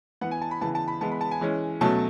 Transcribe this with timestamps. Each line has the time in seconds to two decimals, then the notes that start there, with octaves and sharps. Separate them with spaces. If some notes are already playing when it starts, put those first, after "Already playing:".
0.21 E3 B3 F#5
0.31 G#5
0.41 A5
0.51 B5
0.61 C#3 E3 B3 A5
0.75 A5
0.88 B5
1.01 E3 G#3 B3 A5
1.11 B5
1.21 A5
1.31 G#5
1.41 E3 G#3 C#4
1.81 B2 F#3 A3 C#4 A5